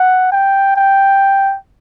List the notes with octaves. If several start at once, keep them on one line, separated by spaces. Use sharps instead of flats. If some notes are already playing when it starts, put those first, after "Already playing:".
Already playing: F#5
G5
G5